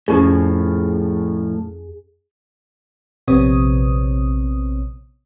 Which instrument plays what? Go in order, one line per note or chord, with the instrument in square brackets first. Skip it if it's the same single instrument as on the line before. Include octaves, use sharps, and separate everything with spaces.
[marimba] F2 C#4 [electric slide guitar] A2 F3 [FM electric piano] G#4
[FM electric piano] A#1 C3 B3 C4 C#5 D#6